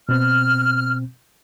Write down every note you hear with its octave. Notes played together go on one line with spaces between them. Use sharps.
B2 C4 F6